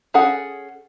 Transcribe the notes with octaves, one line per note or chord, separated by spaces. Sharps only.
C#4 G#4 A4 F#5